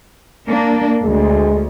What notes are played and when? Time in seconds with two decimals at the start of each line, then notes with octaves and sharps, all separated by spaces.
0.48 A#3 D4
1.04 D2 G#3